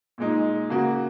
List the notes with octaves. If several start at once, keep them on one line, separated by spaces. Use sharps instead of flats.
A#2 G#3 D#4
C#3 A#3 F#4